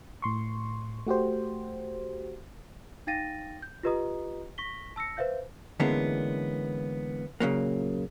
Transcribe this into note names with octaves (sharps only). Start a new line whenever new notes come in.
A2 C6 C#6
A3 F#4 G4 C5
D#4 F5 G5 A6 A#6 D#7
G6
F4 G4 B4 D#5 A#5 D#6
C#6 A#6 B6 G7
A5 E6 A#6 C#7
B4 C5 E5 F5 G6
D3 E3 G#3 A#3 B3 C#4
A#2 C#3 F#3 A#3